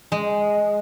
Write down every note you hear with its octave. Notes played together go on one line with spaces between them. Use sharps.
G#3